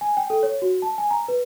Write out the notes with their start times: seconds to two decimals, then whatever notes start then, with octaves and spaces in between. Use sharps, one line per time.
0.01 G#5
0.17 G5
0.30 A4
0.43 C#5
0.62 F#4
0.82 A5
0.98 G#5
1.11 A#5
1.28 B4